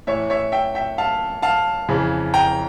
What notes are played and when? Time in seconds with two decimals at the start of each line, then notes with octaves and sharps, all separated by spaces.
0.07 A2 E3 C#5 E5
0.30 C#5 E5
0.52 E5 G5
0.75 E5 G5
0.98 F5 A5
1.42 F5 A5
1.89 F2 C#3 E3
2.34 G5 A#5